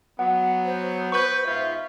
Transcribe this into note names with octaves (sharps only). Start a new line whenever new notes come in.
F#3 B3 F#5
C5
B4 C#6 G6
G#2 B3 F4 E5